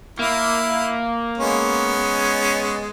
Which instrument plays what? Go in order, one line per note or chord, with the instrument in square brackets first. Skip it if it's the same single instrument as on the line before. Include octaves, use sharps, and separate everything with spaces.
[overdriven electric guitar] A#3 [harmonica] E4
[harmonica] G#3 B3 C#4